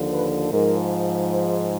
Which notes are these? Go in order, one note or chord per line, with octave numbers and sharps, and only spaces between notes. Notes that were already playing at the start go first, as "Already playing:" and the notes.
Already playing: D#2 D3 F3
B4
G#2 F3 A#4
C5